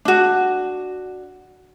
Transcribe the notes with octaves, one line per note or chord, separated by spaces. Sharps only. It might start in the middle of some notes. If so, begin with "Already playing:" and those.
D4 F#4